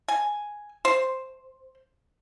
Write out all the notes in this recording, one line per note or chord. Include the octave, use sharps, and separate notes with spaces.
G#5
C5